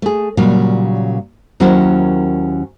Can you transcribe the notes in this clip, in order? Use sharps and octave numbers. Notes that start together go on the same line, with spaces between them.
A3 G#4
A#2 C#3 F#3 G3
D#2 F#3 C#4 E4 A#4 C5